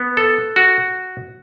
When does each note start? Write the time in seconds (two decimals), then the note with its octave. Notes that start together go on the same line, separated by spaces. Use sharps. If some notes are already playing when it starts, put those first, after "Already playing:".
Already playing: B3
0.17 A4
0.56 F#4